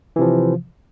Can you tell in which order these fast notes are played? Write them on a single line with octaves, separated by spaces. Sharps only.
E3 C3 F3